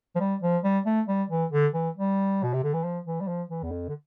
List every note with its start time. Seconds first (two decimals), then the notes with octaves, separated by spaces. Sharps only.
0.15 F3
0.20 G3
0.42 F3
0.64 G3
0.86 A3
1.08 G3
1.30 E3
1.52 D3
1.74 E3
1.96 G3
2.43 B2
2.53 C3
2.64 D3
2.74 E3
2.84 F3
3.05 E3
3.21 G3
3.28 F3
3.49 E3
3.63 E2
3.71 F2
3.89 D3